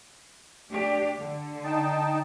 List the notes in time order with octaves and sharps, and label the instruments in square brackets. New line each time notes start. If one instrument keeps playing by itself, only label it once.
[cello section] A3 D4 G4
D3
[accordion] D#4 G5 A5